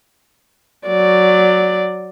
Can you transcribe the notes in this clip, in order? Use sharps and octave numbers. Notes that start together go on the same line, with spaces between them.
F#3 D5